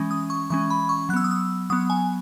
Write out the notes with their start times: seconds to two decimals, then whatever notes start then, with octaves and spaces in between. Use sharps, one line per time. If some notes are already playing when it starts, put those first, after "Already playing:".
Already playing: E3 G#3 C#4
0.11 D#6
0.30 C#6
0.50 E3 G#3 C#4 C#6
0.70 B5
0.89 C#6
1.09 F#3 F#6
1.14 B3 E6
1.24 D#6
1.31 E6
1.70 F#3 B3 D#6
1.90 G#5